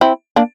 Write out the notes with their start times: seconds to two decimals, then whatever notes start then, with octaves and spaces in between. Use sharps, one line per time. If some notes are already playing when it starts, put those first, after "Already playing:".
0.01 C4 E4
0.36 A#3 D4